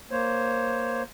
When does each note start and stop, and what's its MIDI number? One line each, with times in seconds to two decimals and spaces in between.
0.11 1.02 58
0.11 1.02 72
0.11 1.02 73